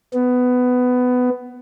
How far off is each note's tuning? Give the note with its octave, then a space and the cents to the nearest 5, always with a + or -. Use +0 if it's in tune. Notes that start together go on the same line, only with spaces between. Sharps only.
B3 +15